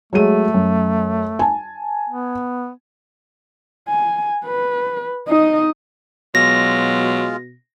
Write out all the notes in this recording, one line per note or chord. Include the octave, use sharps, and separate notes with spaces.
F#3 G#3 A3 D#7
F#2
G#5 A5
B3
G#5
B4
D#4 D#5
B2 F#3 G#3 F4 A#6